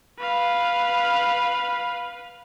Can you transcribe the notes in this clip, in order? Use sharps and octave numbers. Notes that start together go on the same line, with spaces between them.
B4 F5